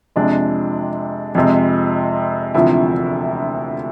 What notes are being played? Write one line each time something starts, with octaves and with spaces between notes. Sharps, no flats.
F2 C3 G#3 D4
F2 C3 G#3
E1 D2 C3 F3 E4